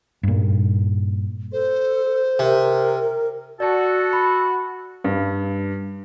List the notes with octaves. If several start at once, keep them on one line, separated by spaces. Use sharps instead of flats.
G2 A#2
A4 C5
C3 A#4
F#4 A4 D5 A5
B5
G2